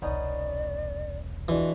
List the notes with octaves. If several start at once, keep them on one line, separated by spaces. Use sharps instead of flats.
E1 C2 B3 C#4 D#4 D5
E3 F3 G#3 D4 F#4